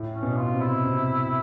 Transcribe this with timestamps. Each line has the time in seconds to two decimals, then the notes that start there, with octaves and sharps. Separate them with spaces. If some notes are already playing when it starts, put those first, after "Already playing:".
Already playing: A2
0.15 C#4
0.23 B2
0.37 F4
0.53 C3
0.61 E4
0.85 C3